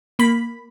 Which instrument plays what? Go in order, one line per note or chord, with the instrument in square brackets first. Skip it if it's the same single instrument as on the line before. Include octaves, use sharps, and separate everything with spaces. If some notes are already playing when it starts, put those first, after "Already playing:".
[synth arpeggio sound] A#3 B5